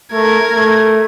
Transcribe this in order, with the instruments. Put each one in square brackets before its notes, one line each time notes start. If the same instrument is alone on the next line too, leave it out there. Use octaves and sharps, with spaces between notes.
[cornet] A3 [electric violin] A#4 G#6
[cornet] A3